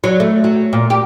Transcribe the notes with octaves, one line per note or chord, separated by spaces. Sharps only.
F#3
A3
F#3
A#2
G4